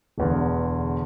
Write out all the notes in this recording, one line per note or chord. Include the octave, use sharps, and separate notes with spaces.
E1 E2 D3